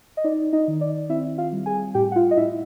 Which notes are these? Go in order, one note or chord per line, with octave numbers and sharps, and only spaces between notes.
D#5
D#4 D5
D#4 D#5
D#3
D5
C4 E4 E5
F4 F5
G3
G#4 G#5
A2 G4 G5
F#5
F4 F5
D#5
A2 E4 E5